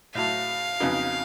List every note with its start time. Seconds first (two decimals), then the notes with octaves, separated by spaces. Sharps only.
0.15 A2 F#3 A3 F5
0.80 F2 C#3 F#3 B3 D#4